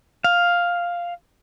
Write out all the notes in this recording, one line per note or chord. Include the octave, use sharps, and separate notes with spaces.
F5